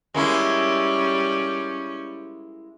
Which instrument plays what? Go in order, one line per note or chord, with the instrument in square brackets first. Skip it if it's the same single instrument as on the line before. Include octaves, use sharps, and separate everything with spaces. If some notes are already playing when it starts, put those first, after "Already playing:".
[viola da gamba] G3 C#4 [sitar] G#3 A#3 E4